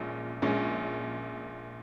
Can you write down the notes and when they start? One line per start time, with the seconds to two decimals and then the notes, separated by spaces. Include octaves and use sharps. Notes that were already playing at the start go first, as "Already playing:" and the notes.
Already playing: A#1 A#2 G#3 C#4
0.42 A#1 A#2 G#3 C#4